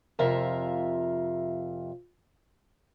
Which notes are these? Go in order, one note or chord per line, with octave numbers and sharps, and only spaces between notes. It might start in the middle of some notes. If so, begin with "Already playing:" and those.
F2 C3 F4 A#4 E5